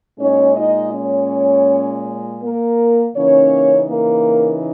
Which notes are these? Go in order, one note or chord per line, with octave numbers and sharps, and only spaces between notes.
A#2 G#3 C#4 D#4 C#5
D#4 D#5
C#4 C#5
A#3 A#4
C#3 E3 A#3 C#4 D#4 C#5
A#3 A#4